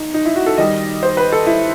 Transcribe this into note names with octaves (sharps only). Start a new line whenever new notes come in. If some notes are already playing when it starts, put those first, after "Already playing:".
Already playing: D#4
D#4
E4
F#4
A4
D#3 G3 D#5
C5
B4
A4
E4